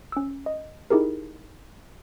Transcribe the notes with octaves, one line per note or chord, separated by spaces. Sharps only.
C#4 E6
D#5
D#4 E4 G4 G#4 A#4